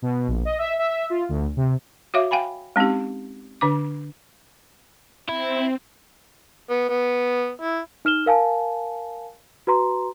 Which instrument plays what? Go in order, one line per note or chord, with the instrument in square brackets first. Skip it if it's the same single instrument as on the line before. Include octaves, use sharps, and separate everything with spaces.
[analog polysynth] B2
A#1
D#5
E5
E5
F4
D2
C3
[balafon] F#4 C#5 E5 F5 D6
F5 G5 G#5 B5
G#3 C4 C#4 D#4 G4
D3 D4 D6
[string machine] C4 [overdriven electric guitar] E4
[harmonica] B3
B3
E4
[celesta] D#4 F6 E7 G7
A#4 F5 G#5 A5
F#4 B4 A#5 C6